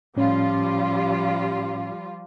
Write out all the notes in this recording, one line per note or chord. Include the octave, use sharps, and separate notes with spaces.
A2 F3 G3 C#4 F4